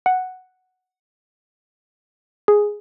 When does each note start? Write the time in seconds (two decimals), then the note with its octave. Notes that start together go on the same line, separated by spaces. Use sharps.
0.06 F#5
2.48 G#4